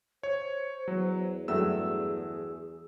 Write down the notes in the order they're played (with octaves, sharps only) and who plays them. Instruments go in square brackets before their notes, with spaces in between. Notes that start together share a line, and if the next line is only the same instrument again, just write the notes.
[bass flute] C5 [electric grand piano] C#5
[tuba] E2 [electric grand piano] F#3
[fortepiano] G2 F#3 A3 [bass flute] G#4 [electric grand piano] E6